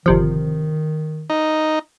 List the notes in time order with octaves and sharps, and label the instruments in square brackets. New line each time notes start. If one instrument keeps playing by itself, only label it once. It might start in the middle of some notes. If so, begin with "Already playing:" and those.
[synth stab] G1 C3 F3 [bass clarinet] D#3
[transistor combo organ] D#4